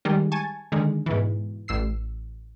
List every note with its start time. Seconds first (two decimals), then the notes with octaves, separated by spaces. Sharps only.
0.05 D#3 G3 G#3
0.32 G#5 A5 C#6
0.72 D3 D#3 G#3
1.06 G#2 B2 E3
1.68 A1 E6 C7